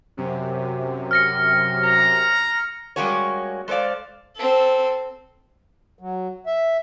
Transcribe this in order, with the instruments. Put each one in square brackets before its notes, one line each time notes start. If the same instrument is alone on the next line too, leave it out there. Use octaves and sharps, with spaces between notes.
[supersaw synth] F#2 C3
[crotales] F6 A#6 C#7
[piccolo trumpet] A#5
[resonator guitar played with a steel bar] G3 G#3 A#3 C#4 F#4 C#5
G#3 A4 C5 D5 F5
[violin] C4 A4
[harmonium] F#3
E5